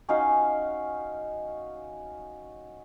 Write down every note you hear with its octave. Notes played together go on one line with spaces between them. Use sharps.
C#4 D#4 F#4 F5